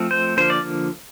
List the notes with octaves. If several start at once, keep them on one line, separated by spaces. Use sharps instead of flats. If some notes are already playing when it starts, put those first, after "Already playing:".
Already playing: F3 A3 C4
C5
D3 F3 A#3 C5
D5